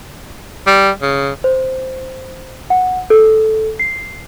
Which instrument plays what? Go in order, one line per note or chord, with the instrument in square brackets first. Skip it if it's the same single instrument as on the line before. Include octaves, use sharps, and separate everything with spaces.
[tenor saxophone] G3
C#3
[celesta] C5
F#5
A4
C7